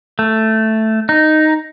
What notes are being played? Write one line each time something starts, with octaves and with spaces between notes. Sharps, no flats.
A3
D#4